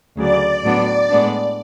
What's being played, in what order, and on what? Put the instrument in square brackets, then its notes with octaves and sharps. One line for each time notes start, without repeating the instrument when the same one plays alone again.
[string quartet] D2 C#3 F#3 [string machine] D5
[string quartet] A2 F#3 B3 D4
A2 G#3 B3 D4